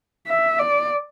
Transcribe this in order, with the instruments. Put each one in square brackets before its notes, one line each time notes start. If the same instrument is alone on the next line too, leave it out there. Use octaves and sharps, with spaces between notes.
[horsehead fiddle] E5
D5